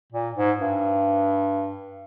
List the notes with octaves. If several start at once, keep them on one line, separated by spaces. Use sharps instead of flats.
A#2
G#2
G2